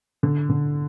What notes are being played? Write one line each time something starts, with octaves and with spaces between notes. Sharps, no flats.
D3
D3